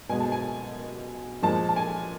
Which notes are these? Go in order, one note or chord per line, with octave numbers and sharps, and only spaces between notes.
B2 G#3 G#5
A5
G#5
A#2 F3 G#3 A5
A5
G#5